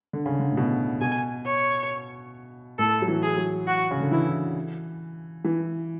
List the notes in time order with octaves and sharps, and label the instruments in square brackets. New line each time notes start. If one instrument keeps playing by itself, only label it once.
[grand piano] D3
C#3
D3
A2
B2
[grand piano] B2 [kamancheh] G#5
[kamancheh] C#5
[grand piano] A2 [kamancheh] A4
[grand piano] F#3
E3
[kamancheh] G#4
[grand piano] F#3
[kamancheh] F#4
[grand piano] C#3
D3
[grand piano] E3 [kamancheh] E4
[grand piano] E3